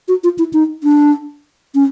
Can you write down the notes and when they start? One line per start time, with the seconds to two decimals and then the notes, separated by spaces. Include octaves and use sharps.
0.08 F#4
0.24 F4
0.39 E4
0.53 D#4
0.84 D4
1.75 C#4